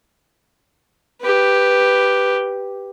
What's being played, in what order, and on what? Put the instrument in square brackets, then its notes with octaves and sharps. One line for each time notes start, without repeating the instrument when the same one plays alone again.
[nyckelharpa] G4 B4